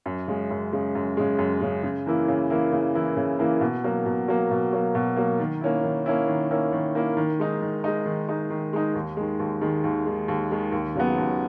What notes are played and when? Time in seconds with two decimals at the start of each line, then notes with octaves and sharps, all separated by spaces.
0.06 F#2
0.28 C#3 G#3
0.50 F#2
0.73 C#3 G#3
0.95 F#2
1.17 C#3 G#3
1.39 F#2
1.61 C#3 G#3
1.83 C#3
2.06 E3 A#3 E4
2.28 C#3
2.50 E3 A#3 E4
2.72 C#3
2.94 E3 A#3 E4
3.17 C#3
3.39 E3 A#3 E4
3.61 B2
3.84 F#3 A#3
4.06 B2
4.28 F#3 A#3
4.51 B2
4.73 F#3 A#3
4.95 B2
5.16 F#3 A#3
5.40 D#3
5.61 A#3 C#4 E4
5.83 D#3
6.06 A#3 C#4 E4
6.28 D#3
6.51 A#3 C#4 E4
6.72 D#3
6.95 A#3 C#4 E4
7.17 D#3
7.39 G#3 D#4
7.61 D#3
7.84 G#3 D#4
8.06 D#3
8.29 G#3 D#4
8.50 D#3
8.73 G#3 D#4
8.95 D#2
9.17 D#3 G#3
9.40 D#2
9.61 D#3 G#3
9.84 D#2
10.06 D#3 G#3
10.28 D#2
10.51 D#3 G#3
10.72 D#2
10.95 C#3 F#3 B3
11.18 D#2